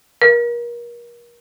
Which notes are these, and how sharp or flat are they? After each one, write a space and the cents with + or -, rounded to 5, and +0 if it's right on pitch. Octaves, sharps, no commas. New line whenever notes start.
A#4 +35